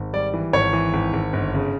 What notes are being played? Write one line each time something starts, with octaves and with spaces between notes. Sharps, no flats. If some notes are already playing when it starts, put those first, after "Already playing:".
Already playing: G#1
G3 D5
E3
G#1 C#5
E3
G#1
G#1
G1
C#3